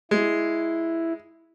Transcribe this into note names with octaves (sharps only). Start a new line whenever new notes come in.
G#3 E4